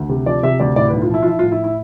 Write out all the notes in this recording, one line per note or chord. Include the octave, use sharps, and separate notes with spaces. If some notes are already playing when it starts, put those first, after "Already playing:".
Already playing: D2
C3
F3 D5
C3 E5
D2 D5
A2 D5
B4
B1
F4
F3 E4
F4
F3 E4
F4
A2
E4
E4